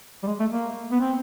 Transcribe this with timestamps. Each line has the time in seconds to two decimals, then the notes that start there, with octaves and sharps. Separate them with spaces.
0.23 G3
0.27 G#3
0.39 A3
0.52 A#3
0.91 B3
1.00 C4